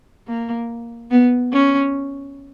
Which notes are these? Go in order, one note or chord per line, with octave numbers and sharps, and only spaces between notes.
A#3
B3
C#4